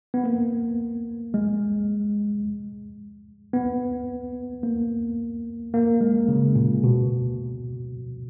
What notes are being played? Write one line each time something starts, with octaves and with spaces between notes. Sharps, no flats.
B3
A#3
G#3
B3
A#3
A#3
G#3
C#3
A#2
B2